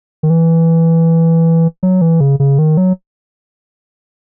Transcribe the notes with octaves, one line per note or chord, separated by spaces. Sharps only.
D#3
E3
F#3
E3
C#3
C#3
D#3
F#3